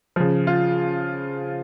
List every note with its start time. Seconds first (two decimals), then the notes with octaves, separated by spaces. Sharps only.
0.16 C#3 F3
0.47 F4